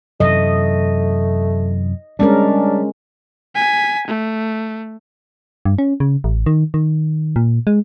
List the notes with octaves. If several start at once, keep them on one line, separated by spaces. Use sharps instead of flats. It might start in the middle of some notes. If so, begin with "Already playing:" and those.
F#2 C3 E3 A3 D#5
G3 G#3 C#4 D4 A#4
G#5 B6
A3
G2
C#4
C#3
A1
D#3
D#3
A#2
G#3